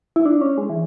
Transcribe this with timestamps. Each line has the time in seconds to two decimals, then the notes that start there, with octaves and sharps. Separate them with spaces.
0.16 E4
0.26 D4
0.41 C#4
0.58 G#3
0.70 E3